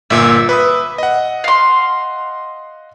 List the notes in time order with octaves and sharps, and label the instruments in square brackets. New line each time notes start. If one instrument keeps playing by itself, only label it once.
[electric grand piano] G1 A#2 [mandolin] E5
[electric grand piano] B4 B5 D#6
D#5 F#5
[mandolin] F5 C6